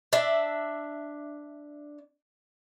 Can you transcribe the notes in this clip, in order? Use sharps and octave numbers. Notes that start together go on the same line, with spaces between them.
D4 E5